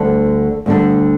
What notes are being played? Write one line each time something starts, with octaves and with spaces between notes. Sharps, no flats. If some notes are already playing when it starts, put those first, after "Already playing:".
Already playing: D2 D3 G3 D4
D2 D3 G3 D4